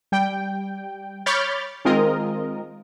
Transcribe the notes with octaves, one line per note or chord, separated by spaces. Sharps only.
G3 G5
C#5 B5 D6 F6 G6 A6
D#3 G#3 C4 F4 A#4 D#5